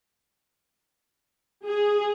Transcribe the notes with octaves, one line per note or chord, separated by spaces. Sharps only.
G#4